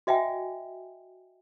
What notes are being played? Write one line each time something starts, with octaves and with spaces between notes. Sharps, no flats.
F#4 D#5 E5 G5 G#5